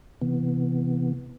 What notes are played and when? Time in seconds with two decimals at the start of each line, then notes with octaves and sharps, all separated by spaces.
0.22 C3 E3 B3